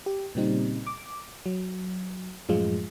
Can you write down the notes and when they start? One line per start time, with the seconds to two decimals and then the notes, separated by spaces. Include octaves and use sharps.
0.06 G4
0.35 A#2 C#3 G3 C4 D#4
0.87 D6
1.46 F#3
2.49 F#2 A2 F3 G#3 F4